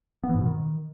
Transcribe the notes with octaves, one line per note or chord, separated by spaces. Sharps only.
B3
E3
G#2
B2
D#3